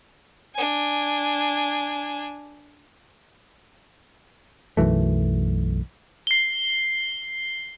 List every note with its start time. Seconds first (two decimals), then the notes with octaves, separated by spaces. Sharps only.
0.54 D4 G#5
4.77 B1 F#2 E3 A3
6.27 C7 G7